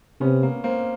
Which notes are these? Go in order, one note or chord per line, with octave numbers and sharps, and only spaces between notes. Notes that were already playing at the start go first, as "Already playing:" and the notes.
C3 B3 C#4
A#3
A#3 C4